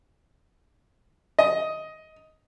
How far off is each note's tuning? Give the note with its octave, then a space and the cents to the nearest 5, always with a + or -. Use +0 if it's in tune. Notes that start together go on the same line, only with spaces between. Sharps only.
D#5 +10